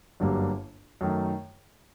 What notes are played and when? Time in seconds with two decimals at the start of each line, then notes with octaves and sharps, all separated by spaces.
0.20 G1 F#2 D3 G3 A#3
1.01 F#2 D#3 A3